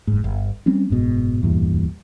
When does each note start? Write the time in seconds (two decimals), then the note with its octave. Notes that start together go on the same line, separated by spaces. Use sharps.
0.07 F#1 G#2
0.24 G1
0.66 G3 C4 C#4
0.90 F#1 G#2 B2
1.42 D1 E2 G2 A#2